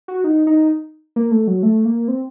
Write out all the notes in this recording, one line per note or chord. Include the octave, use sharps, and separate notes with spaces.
F#4
D#4
D#4
A#3
A3
F#3
A3
A#3
C4